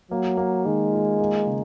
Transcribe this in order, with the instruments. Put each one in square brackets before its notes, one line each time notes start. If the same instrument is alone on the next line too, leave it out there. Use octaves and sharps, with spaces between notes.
[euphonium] F#3 [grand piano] A#3
[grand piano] A#3
[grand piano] D#3 [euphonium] G#3
[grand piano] F4
A#3
C#3